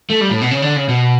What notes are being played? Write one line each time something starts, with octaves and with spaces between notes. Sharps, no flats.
A3
G3
A2
B2
C#3
D3
C#3
B2